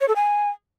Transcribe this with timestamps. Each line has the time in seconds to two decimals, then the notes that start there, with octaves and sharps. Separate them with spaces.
0.01 C#5
0.08 A4
0.16 G#5